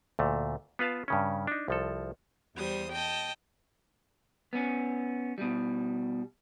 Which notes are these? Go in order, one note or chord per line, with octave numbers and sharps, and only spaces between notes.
D2 A#2 A3
B3 F4 B4 F5 A5
G2 C#3 C#4
D4 D#4
C2 F3 A4
E2 G3 C5 D#6
D#5 G5 A5
B3 C#4
B2 G3